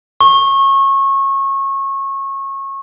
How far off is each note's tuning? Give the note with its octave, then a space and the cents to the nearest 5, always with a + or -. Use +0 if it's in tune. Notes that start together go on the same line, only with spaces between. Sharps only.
C#6 -25